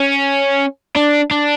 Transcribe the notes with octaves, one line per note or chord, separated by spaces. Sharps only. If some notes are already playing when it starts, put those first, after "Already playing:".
Already playing: C#4
D4
D4